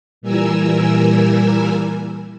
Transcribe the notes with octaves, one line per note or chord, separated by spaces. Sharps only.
A#2 E3 G3 A#4 G#5 E6